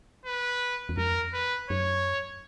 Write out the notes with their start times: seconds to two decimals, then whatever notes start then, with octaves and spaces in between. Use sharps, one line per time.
0.26 B4
0.89 E2
0.97 F2 A#4
1.33 B4
1.69 F#2 C#5